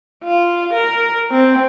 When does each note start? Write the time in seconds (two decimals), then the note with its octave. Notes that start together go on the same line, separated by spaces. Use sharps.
0.24 F4
0.74 A#4
1.31 C4